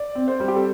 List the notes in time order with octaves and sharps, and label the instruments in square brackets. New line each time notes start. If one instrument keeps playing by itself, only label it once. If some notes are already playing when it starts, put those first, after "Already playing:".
Already playing: [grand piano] D5
C4
C5
G3
G4
A4